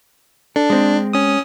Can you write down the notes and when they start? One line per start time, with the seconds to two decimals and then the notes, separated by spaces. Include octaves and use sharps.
0.56 D4 A4
0.70 G#3 C4
1.13 C#4 D#6